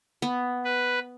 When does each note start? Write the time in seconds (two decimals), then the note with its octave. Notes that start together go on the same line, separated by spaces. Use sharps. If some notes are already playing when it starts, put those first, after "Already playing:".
0.22 B3
0.64 B4